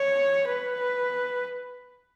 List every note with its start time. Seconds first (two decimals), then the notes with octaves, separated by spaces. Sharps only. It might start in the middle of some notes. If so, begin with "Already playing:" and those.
Already playing: C#5
0.48 B4